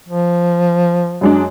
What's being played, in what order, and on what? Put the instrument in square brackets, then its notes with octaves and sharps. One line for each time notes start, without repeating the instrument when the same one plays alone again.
[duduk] F3
[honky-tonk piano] F#2 G#3 D4